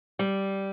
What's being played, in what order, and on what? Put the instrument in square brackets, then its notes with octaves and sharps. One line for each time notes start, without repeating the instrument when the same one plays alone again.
[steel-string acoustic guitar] G3